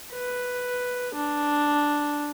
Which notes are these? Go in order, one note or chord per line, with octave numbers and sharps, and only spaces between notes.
B4
D4